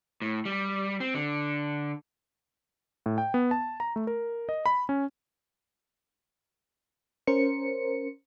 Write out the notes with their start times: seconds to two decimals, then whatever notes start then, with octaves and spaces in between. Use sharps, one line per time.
0.22 A2
0.45 G3
1.00 C4
1.14 D3
3.06 A2
3.18 G5
3.34 B3
3.51 A5
3.80 A#5
3.96 A3
4.07 A#4
4.49 D#5
4.66 B5
4.89 C#4
7.27 C#4 A#4 C5 C#7